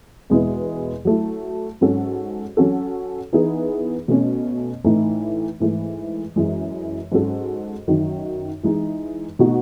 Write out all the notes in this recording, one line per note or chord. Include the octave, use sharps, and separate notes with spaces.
E2 B2 G#3 B3 E4
F#3 A3 E4
G#2 F#3 C#4 F#4 A4
F#3 C#4 F#4 A4
E3 B3 D#4 G#4
B2 A3 C#4
A2 E3 A3 D#4
G#2 E3 A3
F#2 E3 G#3
G#2 F#3 C#4 F#4 A4
F#2 D#3 F#3
E3 G#3 D#4
B2 A3 D#4 F#4